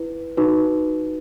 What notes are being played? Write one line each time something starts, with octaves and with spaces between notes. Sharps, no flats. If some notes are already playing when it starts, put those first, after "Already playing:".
Already playing: E4 B4
D#4 F#4 B4